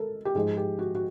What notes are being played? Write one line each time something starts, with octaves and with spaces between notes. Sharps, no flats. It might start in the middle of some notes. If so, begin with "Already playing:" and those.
Already playing: G#3 A4 A#4
G4
G#2 F3 G#3 G#4
G4
F#4
F#4